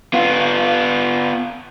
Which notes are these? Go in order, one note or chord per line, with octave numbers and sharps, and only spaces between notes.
B3 F4